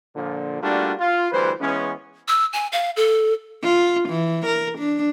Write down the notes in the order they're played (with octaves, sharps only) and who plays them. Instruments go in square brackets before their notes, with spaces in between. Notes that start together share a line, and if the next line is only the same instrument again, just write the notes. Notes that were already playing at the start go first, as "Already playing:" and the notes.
[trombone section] A#2 D3 F3
G3 A3 A#3 D4 F4 F#4
F4
D2 E3 G3 B4 C5
E3 G#3 B3 C#4
[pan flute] E6
G#5
F5
A4
[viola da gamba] F4
E3
A#4
D4